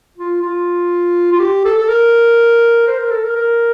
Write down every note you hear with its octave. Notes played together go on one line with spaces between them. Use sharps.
F4
F4
F4
G4
A4
A4
A#4
C5
A#4
A4
A#4
A#4